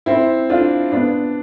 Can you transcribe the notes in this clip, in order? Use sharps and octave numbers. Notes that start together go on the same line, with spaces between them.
C4 E4
D4 F4
B3 D4